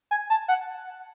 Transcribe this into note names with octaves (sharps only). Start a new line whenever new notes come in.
G#5
A5
F#5